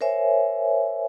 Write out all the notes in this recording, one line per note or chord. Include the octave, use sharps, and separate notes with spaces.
A#4 C5 C#5 E5 G#5